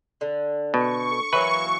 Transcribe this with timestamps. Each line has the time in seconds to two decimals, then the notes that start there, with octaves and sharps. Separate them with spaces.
0.21 D3
0.74 B2 C#6
1.33 E3 F#3 A#3 B4